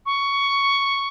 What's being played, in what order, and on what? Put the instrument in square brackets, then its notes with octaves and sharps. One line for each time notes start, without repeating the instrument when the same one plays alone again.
[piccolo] C#6